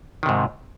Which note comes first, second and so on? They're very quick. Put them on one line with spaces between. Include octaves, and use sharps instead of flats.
D#3 C3 G#2